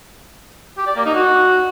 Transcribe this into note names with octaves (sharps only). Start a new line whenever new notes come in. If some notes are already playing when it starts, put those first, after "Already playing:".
G4
D5
A#3
D#4
F#4